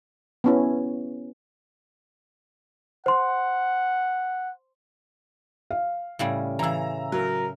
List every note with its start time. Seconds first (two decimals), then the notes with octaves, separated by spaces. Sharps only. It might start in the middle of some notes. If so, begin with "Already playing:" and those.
0.44 B3 C#4 E4
3.06 C5 F#5 C6
5.71 F5
6.19 A2 C#3 G3
6.59 C#3 E3 A#5 E6
7.12 F#3 A#4